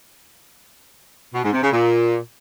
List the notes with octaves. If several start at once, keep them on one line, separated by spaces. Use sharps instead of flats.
B2
G#2
C3
C#3
A#2